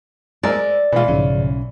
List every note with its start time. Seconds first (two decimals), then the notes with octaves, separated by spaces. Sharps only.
0.43 G#3 A#4 C5 D5 E6
0.92 B2 E3 G#3 F4
1.08 B1 G#2 C#3 F3 C#4